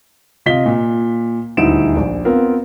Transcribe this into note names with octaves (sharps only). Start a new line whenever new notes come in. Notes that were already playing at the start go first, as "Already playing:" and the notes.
C3 F4 D#5 B6 G7
A#2
D#1 D2 D#4 E4 D7 E7
A#1
B3 C4 F4 A#4